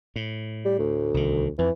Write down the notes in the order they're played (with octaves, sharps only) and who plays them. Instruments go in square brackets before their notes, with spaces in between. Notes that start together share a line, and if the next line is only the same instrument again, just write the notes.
[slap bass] A2
[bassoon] G3
D2
[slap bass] C2 D#3
[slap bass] F2 [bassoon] E3